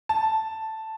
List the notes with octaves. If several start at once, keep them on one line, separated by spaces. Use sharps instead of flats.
A5